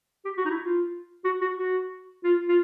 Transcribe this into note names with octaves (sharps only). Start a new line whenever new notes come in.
G4
F#4
D#4
E4
F4
F#4
F#4
F#4
F4
F4